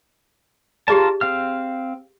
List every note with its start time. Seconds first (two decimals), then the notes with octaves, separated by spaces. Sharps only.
0.88 F4 G4 G#4 A#4 D5 A5
1.21 C4 F5 F6